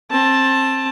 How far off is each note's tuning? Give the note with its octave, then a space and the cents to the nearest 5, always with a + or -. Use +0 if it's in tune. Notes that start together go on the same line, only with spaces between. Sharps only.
C4 +25 A5 +0